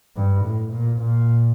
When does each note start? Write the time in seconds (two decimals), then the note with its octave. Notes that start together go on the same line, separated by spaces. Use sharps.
0.16 G2
0.44 A2
0.72 A#2
1.00 A#2